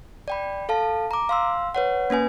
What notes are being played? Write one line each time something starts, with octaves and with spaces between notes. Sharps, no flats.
D5 G5 B5
A4 F5 A5
A#5 D6
F5 C6 E6
B4 C#5 F#5
A#3 C#4 B4 G#5